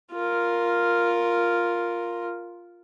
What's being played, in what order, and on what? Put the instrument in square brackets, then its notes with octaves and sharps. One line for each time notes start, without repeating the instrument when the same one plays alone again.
[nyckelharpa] F4 A#4